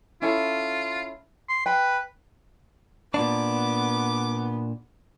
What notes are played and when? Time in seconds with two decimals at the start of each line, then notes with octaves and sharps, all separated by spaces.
0.22 C#4 E4 F4 A4
1.49 C6
1.66 B4 G5
3.14 A#2 B3 D4 D6